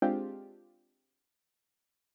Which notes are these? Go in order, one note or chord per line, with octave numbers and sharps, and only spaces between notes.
G#3 C4 D4 F4 G4